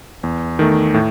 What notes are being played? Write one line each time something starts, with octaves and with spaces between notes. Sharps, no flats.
E2
D#3 A3
A2